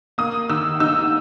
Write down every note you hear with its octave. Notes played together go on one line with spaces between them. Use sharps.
A#3 D#6
D#3 E6
D#4 E6